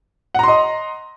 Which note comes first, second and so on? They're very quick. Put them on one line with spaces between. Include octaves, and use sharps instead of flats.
F#5 A#5 C6 D#5